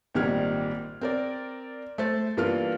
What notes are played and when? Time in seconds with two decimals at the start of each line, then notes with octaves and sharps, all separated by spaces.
0.15 G#1 A#2 D#3 G3 F6 G#6
1.01 C4 A#4 D5
1.98 A3 C5 A6
2.37 G2 E3 A#3 F4 F6